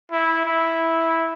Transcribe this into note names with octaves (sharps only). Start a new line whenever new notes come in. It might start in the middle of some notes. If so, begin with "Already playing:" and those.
E4
E4